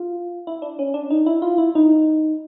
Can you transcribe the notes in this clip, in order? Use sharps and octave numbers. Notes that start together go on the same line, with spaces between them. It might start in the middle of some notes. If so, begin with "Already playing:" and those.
Already playing: F4
E4
D4
C#4
D4
D#4
E4
F4
E4
D#4